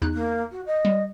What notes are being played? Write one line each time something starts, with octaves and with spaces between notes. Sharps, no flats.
E2 D#4 F#6
A#3
F#4
D#5
G3